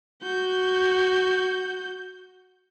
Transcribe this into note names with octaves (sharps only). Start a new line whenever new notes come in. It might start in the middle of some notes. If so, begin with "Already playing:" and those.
F#4 G6